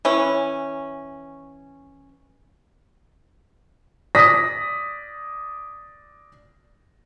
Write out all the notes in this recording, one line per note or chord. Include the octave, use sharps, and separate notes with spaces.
E3 C#4
D5 D#6 A#6 B6